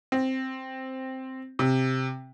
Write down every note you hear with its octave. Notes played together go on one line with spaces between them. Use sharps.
C4
C3